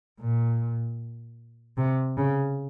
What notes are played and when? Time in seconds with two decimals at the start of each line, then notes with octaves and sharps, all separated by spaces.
0.21 A#2
1.78 C3
2.17 C#3